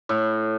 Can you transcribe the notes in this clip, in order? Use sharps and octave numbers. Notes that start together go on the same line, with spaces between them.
A2